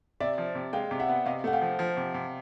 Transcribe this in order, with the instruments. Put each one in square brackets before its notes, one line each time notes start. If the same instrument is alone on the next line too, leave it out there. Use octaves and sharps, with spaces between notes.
[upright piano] C3 [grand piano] D5 E5
[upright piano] F3
C3
[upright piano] G#3 [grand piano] F5 G5
[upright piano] C3
[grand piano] E5 F#5
[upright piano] B3
[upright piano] C3 [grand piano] D#5 F5
[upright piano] A3 [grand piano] F#5
[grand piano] F5 G5
[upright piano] F3
F3
C3
C3